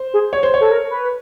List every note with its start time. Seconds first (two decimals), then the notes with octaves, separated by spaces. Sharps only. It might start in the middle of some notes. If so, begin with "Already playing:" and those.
Already playing: C5
0.14 G#4
0.33 C#5
0.43 C5
0.54 C#5
0.61 A4
0.71 A#4
0.90 B4